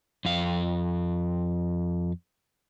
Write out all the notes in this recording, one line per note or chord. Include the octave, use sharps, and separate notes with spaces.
F2 F5